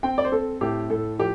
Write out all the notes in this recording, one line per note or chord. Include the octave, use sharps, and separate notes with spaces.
C4 G5
D5
C5
C4 A4
A2 G4
A2 A4
F3 G4